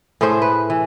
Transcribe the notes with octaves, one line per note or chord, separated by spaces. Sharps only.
A2 A3 G#4 C5
B4
E3